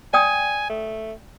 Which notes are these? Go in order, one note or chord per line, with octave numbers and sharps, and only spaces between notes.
D5 G5 G#5 D#6
A3